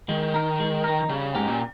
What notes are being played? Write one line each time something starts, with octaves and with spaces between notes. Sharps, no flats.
D#3 G#3
D#4 A#4
G#3
D#4 A#4
C#3 G3
G#2 C#4 G4 A#4
A#2